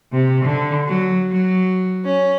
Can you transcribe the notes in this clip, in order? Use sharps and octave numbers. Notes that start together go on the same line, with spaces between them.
C3
D3
F#3
F#3
C#4